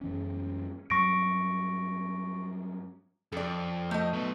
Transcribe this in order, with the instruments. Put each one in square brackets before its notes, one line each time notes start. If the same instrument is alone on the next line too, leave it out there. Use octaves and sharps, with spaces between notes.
[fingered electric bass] F#2 E3 C#4
[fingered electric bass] G2 F#3 G3 [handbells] C#6 A#6 D7
[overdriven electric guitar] F2 [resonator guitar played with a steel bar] A4 D5
[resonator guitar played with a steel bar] A3 D#5
[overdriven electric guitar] F#3 B3